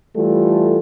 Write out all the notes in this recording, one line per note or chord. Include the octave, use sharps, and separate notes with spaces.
E3 G3 A3 F4 A4